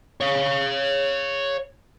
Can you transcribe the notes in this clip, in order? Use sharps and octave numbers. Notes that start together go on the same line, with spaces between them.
C#5 F5